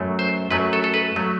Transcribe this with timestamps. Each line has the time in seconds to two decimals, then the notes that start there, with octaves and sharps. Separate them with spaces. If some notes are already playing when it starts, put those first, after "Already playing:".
Already playing: F#2 F#3 A3
0.19 C5
0.51 F#2 F#3 A3 B4
0.73 A4
0.84 A4
0.94 B4
1.16 F#3 A3